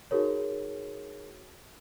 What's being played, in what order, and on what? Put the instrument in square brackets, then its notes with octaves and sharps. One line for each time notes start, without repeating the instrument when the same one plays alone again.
[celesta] D#4 F#4 G#4 A#4 C#5